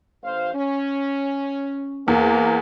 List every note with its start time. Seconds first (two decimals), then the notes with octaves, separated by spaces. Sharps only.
0.23 A1 C5 F5
0.54 C#4
2.08 E2 A#3